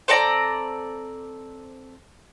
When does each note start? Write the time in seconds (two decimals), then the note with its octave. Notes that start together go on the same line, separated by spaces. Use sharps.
0.08 C4 A4 D5 A#5